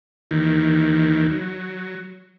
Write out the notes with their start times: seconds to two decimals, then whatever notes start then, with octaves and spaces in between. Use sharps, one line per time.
0.31 D#2 D#3 E3
1.31 F#3